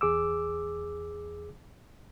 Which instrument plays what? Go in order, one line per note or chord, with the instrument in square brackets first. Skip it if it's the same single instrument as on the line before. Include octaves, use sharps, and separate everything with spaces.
[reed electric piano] E2 G#4 D6 E6